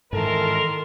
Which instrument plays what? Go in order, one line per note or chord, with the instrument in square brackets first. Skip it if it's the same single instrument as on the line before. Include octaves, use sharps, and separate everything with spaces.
[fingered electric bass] G#2 E3 [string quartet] D#3 A5 C6 [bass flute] A4 [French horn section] A#4